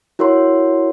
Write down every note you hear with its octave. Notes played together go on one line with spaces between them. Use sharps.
E4 F#4 A#4 C#5 C6